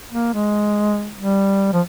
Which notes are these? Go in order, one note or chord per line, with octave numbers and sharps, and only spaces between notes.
A#3
G#3
G3
F3